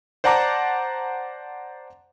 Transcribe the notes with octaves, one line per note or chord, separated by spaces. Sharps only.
C5 D5 F#5 A5 A#5 D6